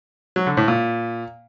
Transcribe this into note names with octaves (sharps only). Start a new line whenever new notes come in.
F#3
D3
A2
A#2